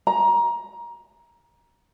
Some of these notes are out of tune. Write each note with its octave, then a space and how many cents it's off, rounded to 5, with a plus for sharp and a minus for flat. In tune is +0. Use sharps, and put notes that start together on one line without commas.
A#5 +20